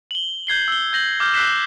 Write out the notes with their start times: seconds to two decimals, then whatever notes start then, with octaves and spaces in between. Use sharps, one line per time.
0.11 F#7 G7
0.47 G6 G#6 C7 G7
0.68 E6 G7
0.93 G6 A#6 F#7
1.20 D6 F6 G6
1.34 E6 F#6 G6 B6 C7 E7